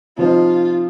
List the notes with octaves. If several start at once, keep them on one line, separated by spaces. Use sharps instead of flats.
C3 F3 C4 D#4 F4